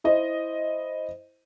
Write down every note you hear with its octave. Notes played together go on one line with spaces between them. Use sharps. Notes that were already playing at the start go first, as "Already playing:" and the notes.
E4 C5 D#5